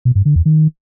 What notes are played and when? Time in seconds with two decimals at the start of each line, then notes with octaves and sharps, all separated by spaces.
0.05 B2
0.15 G2
0.25 D3
0.35 E2
0.45 D#3